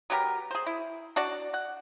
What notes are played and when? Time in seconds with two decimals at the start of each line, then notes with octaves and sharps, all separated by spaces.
0.10 F#3 B3 G4 A#4
0.51 G#4 C5
0.66 E4
1.16 D4 F#4 D5
1.54 F#5